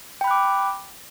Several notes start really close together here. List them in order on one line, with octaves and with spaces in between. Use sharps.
G5 B5 F#6 D6